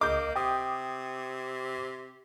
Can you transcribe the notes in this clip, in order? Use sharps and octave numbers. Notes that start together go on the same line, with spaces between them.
C#2 A#3 D#5 D6 G6
C3 G5 D#6